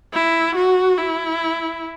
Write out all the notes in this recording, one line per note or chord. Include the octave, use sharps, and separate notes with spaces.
E4
F#4
E4